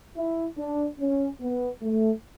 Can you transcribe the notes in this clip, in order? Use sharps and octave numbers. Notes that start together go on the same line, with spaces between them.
E4
D4
C#4
B3
A3